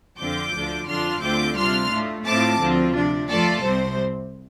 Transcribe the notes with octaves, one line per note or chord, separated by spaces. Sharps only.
F2 D3 F3 C4 F4 D6 G6
D2 D3 F3 D4 F4
F2 D3 F3 D4 F4 C6 F6
D2 D3 A3 C4 F4 D6 G6
C3 G3 D4 F4 C6 F6
A2 A3 F4
A2 A3 C4 F4 A5 D6
D2 D3 F3 C4 F4
C3 F3 D4
F2 F3 A3 F4 A4 D5
C2 C3 G3 C4 C5